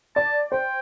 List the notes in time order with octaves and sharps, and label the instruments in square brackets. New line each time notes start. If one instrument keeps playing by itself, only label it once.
[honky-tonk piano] D5 [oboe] A5
[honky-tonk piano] C5 [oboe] G5